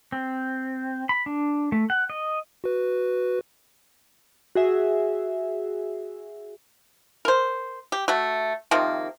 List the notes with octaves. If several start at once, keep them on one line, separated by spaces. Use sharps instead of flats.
C4
B5
D4
A3
F#5
D#5
F#4 B4
F#4 G#4 E5
A#4 C5
G4
A3 F#4
C3 D#3 F3 A#3